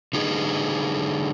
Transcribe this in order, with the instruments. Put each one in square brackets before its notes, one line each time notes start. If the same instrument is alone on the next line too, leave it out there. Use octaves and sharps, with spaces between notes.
[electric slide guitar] D3 D#4 G#4 B4